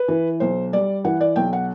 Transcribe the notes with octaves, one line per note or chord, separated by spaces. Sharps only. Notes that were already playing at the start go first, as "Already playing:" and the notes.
Already playing: B4
E3
B1 C5
G3 D5
E3 F#5
D5
B1 G5
F#5